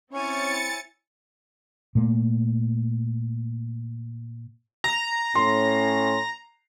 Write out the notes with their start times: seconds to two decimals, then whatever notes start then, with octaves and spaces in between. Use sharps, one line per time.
0.13 C4 C#4 E4 C#5 G#5 A6 C#7
1.95 A#2 A3 A#3
4.84 A#5 A#6
5.35 A2 C#4 C6